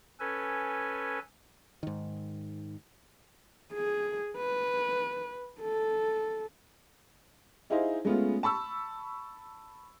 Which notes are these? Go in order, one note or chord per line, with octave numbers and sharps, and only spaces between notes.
C#4 A4 B4 G#5
G#2 D#3
G#4
B4
A4
D#4 E4 G#4 C5 D#5 F5
G#3 A3 B3 C#4 F4
A5 B5 C#6 E6